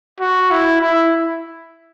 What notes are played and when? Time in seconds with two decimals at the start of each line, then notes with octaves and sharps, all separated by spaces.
0.20 F#4
0.51 E4
0.81 E4